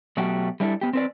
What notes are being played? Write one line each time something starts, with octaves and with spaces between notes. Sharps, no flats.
B2 F#3 A3 F#4 G4
G3 A3 D4 E4 A4
B3 G4
C4 B4 D5